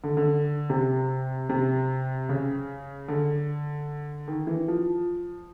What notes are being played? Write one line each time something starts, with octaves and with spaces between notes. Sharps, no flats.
D3
D3
C3
C3
C#3
D3
D#3
E3
F3